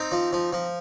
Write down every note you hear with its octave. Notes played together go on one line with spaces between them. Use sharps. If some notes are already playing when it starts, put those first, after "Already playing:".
Already playing: C4 D#4
F3
F3
F3